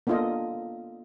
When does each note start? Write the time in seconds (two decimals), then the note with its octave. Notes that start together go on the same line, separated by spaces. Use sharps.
0.07 A#3 B3 D4 F4 A4 D#5